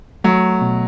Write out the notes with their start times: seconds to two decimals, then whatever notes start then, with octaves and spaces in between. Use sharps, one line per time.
0.24 F#3 A3
0.61 B2